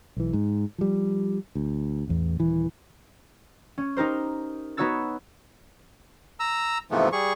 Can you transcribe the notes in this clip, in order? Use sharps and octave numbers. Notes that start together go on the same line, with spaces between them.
B1 E3
G#2
F3 G3
D2
A1 E2
D#1 E3
C#4
D#4 G4 A#4 C5
B3 D#4 F#4 C#5 E6 A6
A#5 E6
G#2 C3 E3 F3 A3 B3
G3 G#4 C#6